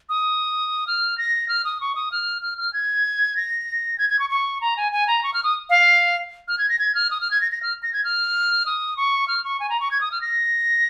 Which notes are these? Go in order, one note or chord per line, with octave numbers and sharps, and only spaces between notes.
D#6
F6
A#6
F6
D#6
C#6
D#6
F6
F6
F6
G#6
A#6
G#6
G#6
C#6
C#6
A#5
G#5
G#5
A#5
C#6
F6
D#6
F5
F6
G#6
A#6
G#6
F6
D#6
F6
G#6
A#6
A#6
F6
A#6
G#6
F6
D#6
C#6
F6
C#6
G#5
A#5
C#6
G#6
D#6
F6
A#6